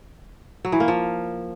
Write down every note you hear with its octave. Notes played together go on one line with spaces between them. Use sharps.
F#3
E3
A#3
F3